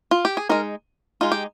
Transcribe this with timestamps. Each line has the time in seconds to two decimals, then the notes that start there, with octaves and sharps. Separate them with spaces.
0.11 F4
0.25 G4
0.37 G#4
0.49 G#3 D#4 A#4
1.21 G#3 D#4 F4
1.32 G4